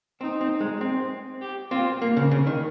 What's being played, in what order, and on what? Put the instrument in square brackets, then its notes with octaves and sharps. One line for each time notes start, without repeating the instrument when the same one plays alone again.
[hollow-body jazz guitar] C4 [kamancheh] D#4
[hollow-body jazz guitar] C4
G#3
C4
[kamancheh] G4
[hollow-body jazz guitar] C4 [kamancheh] F4
[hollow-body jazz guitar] A#3
C#3
C#3
D#3